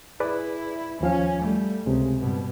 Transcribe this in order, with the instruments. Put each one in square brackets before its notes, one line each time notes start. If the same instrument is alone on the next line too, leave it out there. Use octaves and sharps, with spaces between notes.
[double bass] E4 [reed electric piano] G#4 B4 D5
[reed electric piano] D#2 F3 F5 [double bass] C#4
[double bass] G3 A3
[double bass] C#2 [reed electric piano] C3 G#3
[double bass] G2 B2